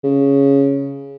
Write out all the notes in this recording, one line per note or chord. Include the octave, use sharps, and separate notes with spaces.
C#3